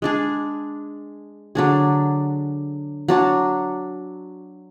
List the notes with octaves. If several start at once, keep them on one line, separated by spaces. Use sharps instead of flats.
G#3 D4 G#4
D3 F#3 D4 G#4
F#3 D4 F#4